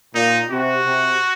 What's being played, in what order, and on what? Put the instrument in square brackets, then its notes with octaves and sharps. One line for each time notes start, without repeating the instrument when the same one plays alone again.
[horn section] A#2 [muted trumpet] D#4
[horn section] C3 [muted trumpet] F#4
[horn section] C3